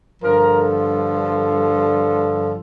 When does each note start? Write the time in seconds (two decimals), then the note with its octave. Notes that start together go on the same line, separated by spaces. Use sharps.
0.22 G2 D3 F3 A#4
0.59 A4